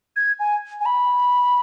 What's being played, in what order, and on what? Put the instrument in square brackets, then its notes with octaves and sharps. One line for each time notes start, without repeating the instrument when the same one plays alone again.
[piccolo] G#6
G#5
G#5
B5